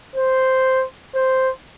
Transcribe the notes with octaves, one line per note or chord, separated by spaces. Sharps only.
C5
C5